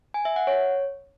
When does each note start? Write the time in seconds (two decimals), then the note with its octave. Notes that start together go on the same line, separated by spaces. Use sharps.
0.14 G#5
0.25 E5
0.36 F#5
0.47 C#5